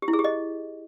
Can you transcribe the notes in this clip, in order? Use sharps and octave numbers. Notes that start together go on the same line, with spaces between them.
G4
E4
G#4
G4
D#5